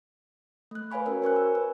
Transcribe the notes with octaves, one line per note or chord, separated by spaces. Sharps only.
A3 F#6
B4 C#5 F5 G#5 B5 C#6
C#4 F#4 A#4 C#5
C5 G#5 C#6 F#6
E6
B4